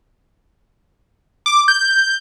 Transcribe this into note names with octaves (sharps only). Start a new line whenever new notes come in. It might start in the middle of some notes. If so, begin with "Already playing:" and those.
D6
G6